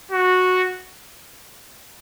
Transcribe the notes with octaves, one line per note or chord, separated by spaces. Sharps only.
F#4